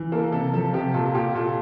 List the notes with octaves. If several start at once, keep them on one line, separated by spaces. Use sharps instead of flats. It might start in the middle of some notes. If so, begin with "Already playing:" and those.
Already playing: E3
A#3 A4
C3 A4
F3 A4
C3 G4
A#2 A4
A#2 G4
A#2 A4